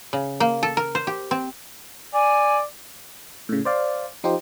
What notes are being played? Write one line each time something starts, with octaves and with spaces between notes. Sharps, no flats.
C#3
A#3
A4
A#4
C5
G4
C4
D5 G#5
A2 C#3
C5 D5 F5
F3 D#4 F4 G4 C5